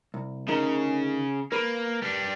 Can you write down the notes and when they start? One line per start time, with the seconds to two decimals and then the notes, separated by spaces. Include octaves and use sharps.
0.14 C2
0.48 D2 C#3 D#4 A#4
1.52 A#3 A#4 B4
2.03 G3 D4